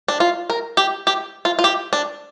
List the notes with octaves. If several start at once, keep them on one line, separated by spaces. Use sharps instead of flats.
D4
F4
A#4
G4
G4
F4
F4
G4
D4